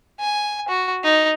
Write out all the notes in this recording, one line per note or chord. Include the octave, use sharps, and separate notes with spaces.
G#5
F#4
D#4